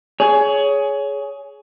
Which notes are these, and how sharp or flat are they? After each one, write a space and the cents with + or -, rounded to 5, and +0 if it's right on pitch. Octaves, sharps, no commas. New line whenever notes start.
G#4 +15 C#5 +20